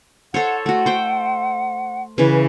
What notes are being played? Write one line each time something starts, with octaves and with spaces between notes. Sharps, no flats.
A4 C5 C#5 F#5
A3 F#4 F#5
C5 G5
C#3 E3 B4